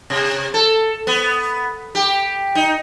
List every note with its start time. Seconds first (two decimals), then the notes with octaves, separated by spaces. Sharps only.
0.10 C3
0.54 A4
1.07 B3
1.95 G4
2.55 D#4